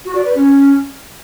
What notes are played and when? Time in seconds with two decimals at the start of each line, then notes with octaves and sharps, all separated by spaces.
0.05 F#4
0.15 D5
0.25 B4
0.35 C#4